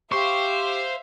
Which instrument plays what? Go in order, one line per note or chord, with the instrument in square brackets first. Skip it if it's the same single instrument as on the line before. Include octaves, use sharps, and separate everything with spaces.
[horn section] G4 [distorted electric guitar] C5 [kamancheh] E5 F5 [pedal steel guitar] C#6